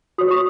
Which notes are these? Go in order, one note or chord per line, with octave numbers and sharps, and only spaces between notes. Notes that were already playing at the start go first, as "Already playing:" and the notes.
F#4 C#5 D#6
C#6